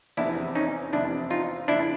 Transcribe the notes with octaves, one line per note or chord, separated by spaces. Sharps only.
F1 E2 C3 D4 E4
C#4 D#4
F1 E2 C3 D4 E4
D#4 F4
F2 C#3 D4 E4